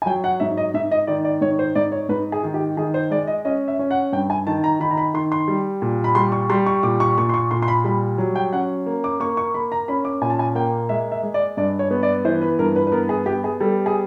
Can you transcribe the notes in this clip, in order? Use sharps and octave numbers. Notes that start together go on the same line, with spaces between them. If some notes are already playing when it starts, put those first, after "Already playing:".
G#5
F#3 G5
F#5
G#2 E5
D#5
G#2 E5
D#5
D#3 D5
D5
G#2 C#5
C5
G#2 D5
C#5
G#2 B4
G#4
D#3
G4
D#3 G#4
C5
G#3 D5
D#5
C#4 D#5
E5
C#4
F#5
G2 G5
G#5
D#3 A5
A#5
D#3 B5
A#5
B5
D#3 C6
C6
G3
A#2
B5
G3 C6
C#6
G3 C6
C#6
A#2 D6
C#6
A#2 C#6
C6
C#6
A#2 C6
C6
B5
G3 B5
F#3
G5
C#4 F#5
A#3
D6
A#3 C#6
C#6
A#3 B5
A#5
C#4 B5
D6
A#2 G#5
A5
G#5
A#3 G5
G#3 E5
E5
G#3
D5
G2 D5
C#5
B3
D5
E3 C5
B4
G2 A#4
B4
B4
B3 A#4
G#4
B3 G4
G#4
G3 A4
G#4